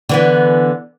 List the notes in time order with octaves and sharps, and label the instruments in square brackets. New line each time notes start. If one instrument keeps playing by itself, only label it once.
[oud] D3 E3 B3